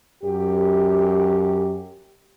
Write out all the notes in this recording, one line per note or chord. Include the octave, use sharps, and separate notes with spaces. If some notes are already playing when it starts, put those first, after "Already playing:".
F#2 G4